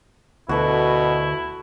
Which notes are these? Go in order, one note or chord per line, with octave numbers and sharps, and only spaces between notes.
D2 B2 E4 F#4 A4 B4